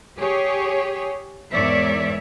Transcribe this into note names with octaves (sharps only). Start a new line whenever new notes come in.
G4 G#4 C#5
E2 G#2 A#4 C#5 D5 E5